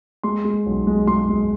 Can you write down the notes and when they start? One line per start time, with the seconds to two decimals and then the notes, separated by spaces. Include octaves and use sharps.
0.24 G#3 C6
0.45 G#3
0.66 B1
0.87 G#3
1.07 G#3 C6
1.29 G#3